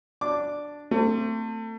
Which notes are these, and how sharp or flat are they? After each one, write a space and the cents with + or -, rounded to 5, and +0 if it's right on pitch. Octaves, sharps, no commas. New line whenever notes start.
D4 +0 D6 +0
A3 +35 C4 -5